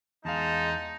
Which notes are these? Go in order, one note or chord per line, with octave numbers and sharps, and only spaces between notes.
E2 G#3 D#4 D#5 F5 A5